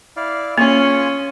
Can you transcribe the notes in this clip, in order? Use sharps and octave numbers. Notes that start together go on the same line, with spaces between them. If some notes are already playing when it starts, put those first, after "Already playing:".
E4 D5 F5
A#3 C#4 F4 G#4 C#6